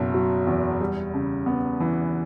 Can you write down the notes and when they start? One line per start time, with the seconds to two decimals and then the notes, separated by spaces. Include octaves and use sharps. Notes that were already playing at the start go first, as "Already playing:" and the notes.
Already playing: F#1 B2
0.14 F#3
0.47 E2
0.81 G3
1.14 C#3
1.46 B3
1.80 E3